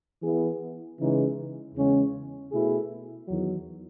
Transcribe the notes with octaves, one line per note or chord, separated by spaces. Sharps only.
E3 B3 E4 G#4
C#3 E3 G#3 D#4
E2 C#3 G#3 C#4
B2 A3 E4 G#4
E2 D#3 F#3